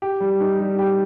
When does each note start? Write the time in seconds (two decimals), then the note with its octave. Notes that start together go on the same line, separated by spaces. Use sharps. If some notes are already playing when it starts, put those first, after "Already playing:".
0.02 G4
0.20 G3
0.40 D#4
0.59 G3
0.79 G4